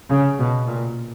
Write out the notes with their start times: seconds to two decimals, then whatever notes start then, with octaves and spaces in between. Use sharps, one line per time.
0.08 C#3
0.38 B2
0.67 A#2